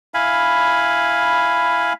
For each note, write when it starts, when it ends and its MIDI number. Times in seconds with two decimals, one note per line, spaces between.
0.14 1.93 64
0.14 1.93 77
0.14 1.93 80
0.14 1.93 83